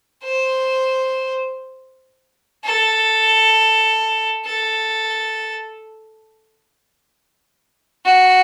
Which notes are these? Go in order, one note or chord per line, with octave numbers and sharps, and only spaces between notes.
C5
A4
A4
F#4